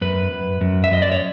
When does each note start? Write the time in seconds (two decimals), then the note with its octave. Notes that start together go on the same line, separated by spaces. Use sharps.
0.01 F#2 B4
0.31 F#2
0.61 F#2
0.84 E5
0.91 F#2 D#5
1.02 D5
1.12 C#5